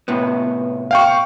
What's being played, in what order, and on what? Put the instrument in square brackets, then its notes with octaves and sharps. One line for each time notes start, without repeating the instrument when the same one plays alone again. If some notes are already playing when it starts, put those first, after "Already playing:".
[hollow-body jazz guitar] A2 C3 B3
[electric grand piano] F5 G5 C#6